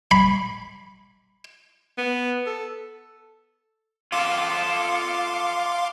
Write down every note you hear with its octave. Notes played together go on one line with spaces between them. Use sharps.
B5
B3
A4
F4 A4 F5 C6 D6